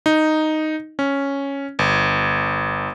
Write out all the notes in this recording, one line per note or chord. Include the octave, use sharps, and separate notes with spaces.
D#4
C#4
G1